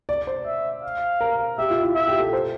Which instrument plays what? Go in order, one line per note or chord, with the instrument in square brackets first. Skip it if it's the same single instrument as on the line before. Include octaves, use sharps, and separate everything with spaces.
[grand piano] D5
C5
[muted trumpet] E5
F5
[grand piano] A#4
[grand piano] G4 [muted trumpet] E5
[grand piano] F4
E4
[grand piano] F4 [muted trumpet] E5
[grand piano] G4
A4
C5